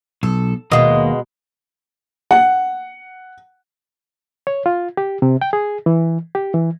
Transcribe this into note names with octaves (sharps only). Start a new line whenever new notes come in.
B1 A4
D#2 B2 G#3 A#3 D#5
F#5
C#5
F4
G4
C3
G5
G#4
E3
G4
E3